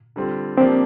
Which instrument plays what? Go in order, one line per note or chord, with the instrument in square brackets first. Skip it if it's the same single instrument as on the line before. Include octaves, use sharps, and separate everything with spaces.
[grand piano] D3 G3 C4 F4
[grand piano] F3 A#3 D4 G4 [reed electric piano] C4